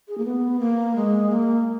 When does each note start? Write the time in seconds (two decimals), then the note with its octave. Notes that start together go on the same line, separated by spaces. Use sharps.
0.08 G#4
0.18 A#3
0.25 B3
0.60 A#3
0.96 G#3
1.30 A#3